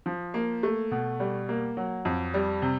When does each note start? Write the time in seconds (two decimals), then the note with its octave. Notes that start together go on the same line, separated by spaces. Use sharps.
0.06 F3
0.34 A#3
0.63 A3
0.91 B2
1.20 G3
1.49 A#3
1.77 F#3
2.05 F2
2.34 G3
2.62 C3